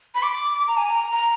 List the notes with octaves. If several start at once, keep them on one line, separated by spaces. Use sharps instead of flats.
B5
D6
A#5
G#5
A#5
A#5